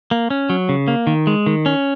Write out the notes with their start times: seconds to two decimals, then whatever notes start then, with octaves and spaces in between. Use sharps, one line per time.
0.11 A#3
0.30 C#4
0.50 F#3
0.69 C#3
0.88 A#3
1.07 D#3
1.27 G#3
1.46 D#3
1.66 C#4